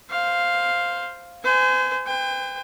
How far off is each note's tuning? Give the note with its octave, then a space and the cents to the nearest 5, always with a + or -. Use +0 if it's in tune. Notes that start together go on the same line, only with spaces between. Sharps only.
C5 +0 F5 +0
C5 -35 G#5 +0
C5 -45 G5 +35